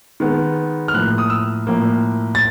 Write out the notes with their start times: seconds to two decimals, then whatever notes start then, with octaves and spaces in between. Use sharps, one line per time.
0.20 D#3 G#3 B3
0.88 F6
0.94 A2 F3 A#3 F#6
1.18 D#6
1.30 E6
1.67 A2 F3 A#3
2.35 A6